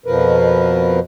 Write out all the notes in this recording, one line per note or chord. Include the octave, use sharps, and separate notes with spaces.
F2 B2 F3 A#4 B4